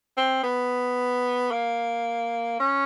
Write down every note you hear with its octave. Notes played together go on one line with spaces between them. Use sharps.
C4
B3
A#3
C#4